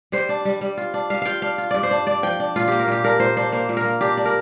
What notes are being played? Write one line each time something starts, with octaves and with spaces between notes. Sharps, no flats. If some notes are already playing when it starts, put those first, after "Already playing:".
G3 C5
D4
G3
G3
F4
D4
G3 F5
F4 F5 G5
D4 F5
F4
G2 D5
C5
D4
D4 D5
F3 G5
D4
A#2 F4
A#3 G4
A#4
A#2 G4
D4 A#4
A#2 C5
D4 C5
A#3 C5
A#2
A#4
A#3
D4 G4
D4
A#4